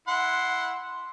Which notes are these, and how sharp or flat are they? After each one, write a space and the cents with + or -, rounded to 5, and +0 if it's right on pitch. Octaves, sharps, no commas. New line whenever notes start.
E4 -5 F#5 -5 C6 +0